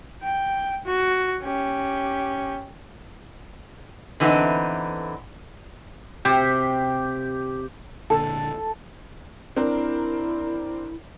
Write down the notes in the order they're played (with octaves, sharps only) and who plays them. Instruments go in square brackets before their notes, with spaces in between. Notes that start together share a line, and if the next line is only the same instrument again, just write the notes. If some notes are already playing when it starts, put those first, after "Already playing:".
[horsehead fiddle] G5
F#4
C#4 G4
[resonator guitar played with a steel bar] D3 E3 B3 C4 D#4
[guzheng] C3 C5 [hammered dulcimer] G4
[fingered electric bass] A#1 D3 [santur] A4
[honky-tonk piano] C4 D4 A#4 [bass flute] E4